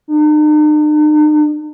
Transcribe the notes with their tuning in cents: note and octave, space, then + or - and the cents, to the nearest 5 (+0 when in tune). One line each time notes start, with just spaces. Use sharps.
D#4 -45